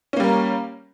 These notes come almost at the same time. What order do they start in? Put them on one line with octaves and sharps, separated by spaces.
C#4 A#3 G3 A#4